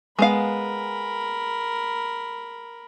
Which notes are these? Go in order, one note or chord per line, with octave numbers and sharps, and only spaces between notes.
G#3 B3 A#4 F5 B5